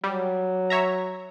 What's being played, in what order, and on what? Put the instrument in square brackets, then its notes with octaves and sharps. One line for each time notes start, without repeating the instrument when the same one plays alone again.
[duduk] F#3 [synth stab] G3
[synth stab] C#5 E5 A#5